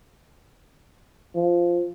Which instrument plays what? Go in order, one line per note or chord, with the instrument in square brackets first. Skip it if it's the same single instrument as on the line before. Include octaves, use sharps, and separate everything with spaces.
[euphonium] F3